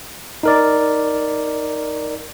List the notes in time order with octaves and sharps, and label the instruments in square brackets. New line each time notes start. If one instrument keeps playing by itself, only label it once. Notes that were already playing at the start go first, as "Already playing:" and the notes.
[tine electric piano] D#4 A#4 D5